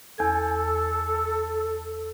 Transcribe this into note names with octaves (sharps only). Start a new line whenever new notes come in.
E2 A4 G#5 G#6